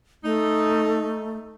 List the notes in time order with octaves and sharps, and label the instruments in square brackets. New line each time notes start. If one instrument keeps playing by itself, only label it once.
[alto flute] A3 [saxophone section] D#4